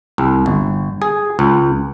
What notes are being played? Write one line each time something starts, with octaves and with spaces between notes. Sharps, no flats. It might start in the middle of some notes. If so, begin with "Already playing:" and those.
C2
G1
G#4
C#2